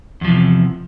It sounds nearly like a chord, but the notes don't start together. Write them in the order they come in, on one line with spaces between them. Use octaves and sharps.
E2 F3 C3